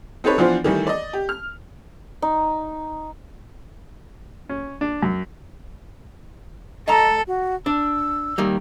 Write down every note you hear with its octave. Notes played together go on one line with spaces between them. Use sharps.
C4 D#4 G4 A4 B4 C#5
E3 F3 B3 D4 F4 C5
D#3 E3 G3 A3
D5 D#5
G4
F6
D#4
C#4
D4
F#2
A4 D#5 A5 A#5
F#4
D4 E6
D#3 G3 A#3